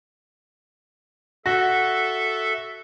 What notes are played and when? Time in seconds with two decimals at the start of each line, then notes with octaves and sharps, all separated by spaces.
1.46 F#4 A4 E5